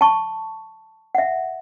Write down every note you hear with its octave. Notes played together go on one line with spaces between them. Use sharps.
A5 C#6
E5 F#5